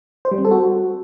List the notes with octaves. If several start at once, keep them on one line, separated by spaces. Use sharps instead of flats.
C5
G3
C4
A4
F#4